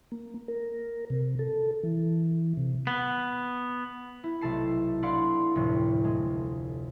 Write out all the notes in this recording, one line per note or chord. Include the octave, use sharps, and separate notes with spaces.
A#3
A#4
C3
A4
E3
C3
B3
E4
B1 C3 A3 A4 A5 C7
D4 E4 D5 F5 F#5 C6
F1 D2 A2 C3
G#3